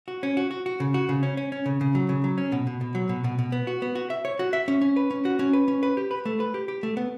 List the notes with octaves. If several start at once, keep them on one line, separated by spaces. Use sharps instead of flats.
F#4
C#4
F#4
F#4
F#4
C#3
F#4
C#3
C#4
C#4
C#4
C#3
C#3
F#3
C#3
F#3
C#4
B2
B2
B2
F#3
B2
B2
B2
B3
F#4
B3
F#4
E5
C#5
F#4
E5
C#4
C#4
B4
C#4
F#4
C#4
B4
C#4
B4
G4
B4
A3
B4
G4
G4
A3
B3